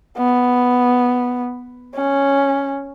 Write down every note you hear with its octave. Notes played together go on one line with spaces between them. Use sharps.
B3
C#4